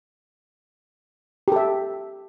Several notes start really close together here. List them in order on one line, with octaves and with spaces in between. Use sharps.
G4 A4 E5